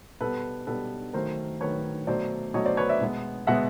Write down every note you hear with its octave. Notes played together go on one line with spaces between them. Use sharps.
B2 G3 B3 A4 B4
B2 G3 B3 A4 B4
D#3 F#3 A3 A#4 C5
D#3 F#3 A3 B4 C#5
B2 F#3 A3 C5 D5
B2 F#3 A3 C#5 D#5
C5 D5
B4 C#5
D5 E5
B2 G#3 B3
B2 G#3 B3 E5 F#5